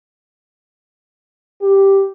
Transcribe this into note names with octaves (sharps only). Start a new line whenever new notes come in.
G4